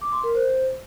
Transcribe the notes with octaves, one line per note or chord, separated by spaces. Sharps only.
D6
C6
A#4
C5